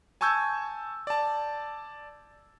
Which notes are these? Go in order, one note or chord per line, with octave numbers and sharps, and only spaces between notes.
G#5 A5 C#6 E6 G6 G#6
D5 A5